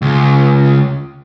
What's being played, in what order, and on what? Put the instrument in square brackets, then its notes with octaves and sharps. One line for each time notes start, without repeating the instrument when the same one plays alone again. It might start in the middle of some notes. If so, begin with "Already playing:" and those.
[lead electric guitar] C#2